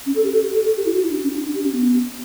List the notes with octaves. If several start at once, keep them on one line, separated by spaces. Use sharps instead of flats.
C#4
A4
G4
A4
G4
A4
A4
G4
E4
F#4
E4
D4
C#4
D4
D4
G4
C#4
B3